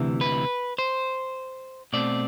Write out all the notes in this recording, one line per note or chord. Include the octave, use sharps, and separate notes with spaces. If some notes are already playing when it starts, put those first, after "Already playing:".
Already playing: D2 C3 E3
B4
C5
B2 A3 C4 D5